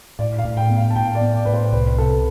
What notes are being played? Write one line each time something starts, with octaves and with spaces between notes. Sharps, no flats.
A2 D5
F5
A2
G5
B3
F5
A5
A2 G5
D5
B3
D5
A2 B4
C5
C2 B4
C3 A4